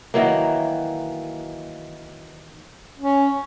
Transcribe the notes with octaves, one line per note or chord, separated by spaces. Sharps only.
D#3 E3 F#3 A#3
C#4